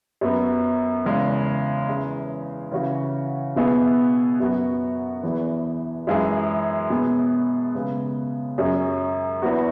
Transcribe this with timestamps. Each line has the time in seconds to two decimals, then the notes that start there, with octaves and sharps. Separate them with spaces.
0.21 F#2 F#3 B3
1.05 E2 C#3 G#3
1.88 E3 C#4 E4 G#4
2.71 C#3 E3 C#4 F#4
3.56 B2 B3 E4 G#4
4.40 F#2 F#3 B3 F#4
5.23 E2 E3 B3 G#4
6.07 F#2 E3 G#3 E4 G#4
6.90 B2 B3 G#4
7.75 C#3 G#3 B3 G#4
8.58 F#2 F#3 C#4 G#4
9.42 E2 E3 B3 F#4